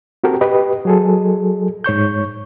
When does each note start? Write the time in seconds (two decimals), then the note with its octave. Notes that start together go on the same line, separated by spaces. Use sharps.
0.24 C4 F#4 G4 A4 A#4 G5
0.41 G4 B4 D#5
0.85 F#3 G#4 A4
1.84 G#2 C#5 C#6 G6